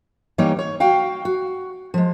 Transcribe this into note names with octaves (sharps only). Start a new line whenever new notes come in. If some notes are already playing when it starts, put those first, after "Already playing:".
E3 G3 A#3 D#4 C#5
C#5
F#4 F5 G5
F#4
F3 G#3